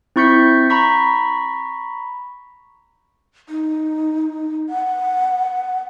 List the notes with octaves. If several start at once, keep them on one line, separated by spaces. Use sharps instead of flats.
C4 E4 C#6 G6 B6 C#7
A#5 B5 C#6 B6
D#4
F#5